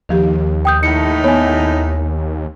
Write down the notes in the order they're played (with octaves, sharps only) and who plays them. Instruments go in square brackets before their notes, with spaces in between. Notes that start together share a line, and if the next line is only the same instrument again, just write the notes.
[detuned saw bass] D#2 [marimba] D#3 F3 G4
[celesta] G5 D#6 G6
[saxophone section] A2 D#4 [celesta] C#7
[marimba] B3 [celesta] C#5 G#5